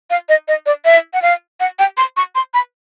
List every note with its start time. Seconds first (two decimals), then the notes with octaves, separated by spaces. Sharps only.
0.10 F5
0.29 D#5
0.48 D#5
0.66 D5
0.85 E5
1.13 F#5
1.22 F5
1.60 F#5
1.79 G5
1.97 C6
2.17 C#6
2.35 C6
2.54 B5